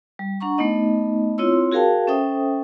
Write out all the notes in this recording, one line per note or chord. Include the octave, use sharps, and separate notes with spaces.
G3
D4 F#5 A#5 C#6
A3 B3 D#4 D#5
C4 E4 F4 C#5 C6 E6
F#4 G#4 A#4 F5 G5 A5
C#4 A4 C5 E5 G5 D#6